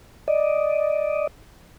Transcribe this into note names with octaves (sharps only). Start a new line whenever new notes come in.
D5 D#5